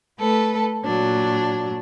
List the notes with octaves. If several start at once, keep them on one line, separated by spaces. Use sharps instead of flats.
A3 A4 B4
A#2 F#3 D4